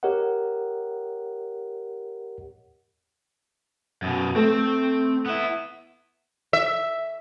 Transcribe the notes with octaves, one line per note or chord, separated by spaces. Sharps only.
G4 A#4 C#5 D#5 F#5
F#2 B2
A3 C4
B3 E4
E5